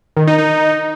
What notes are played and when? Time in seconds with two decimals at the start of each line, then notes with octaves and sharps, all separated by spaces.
0.17 D#3
0.27 D#4
0.38 D#4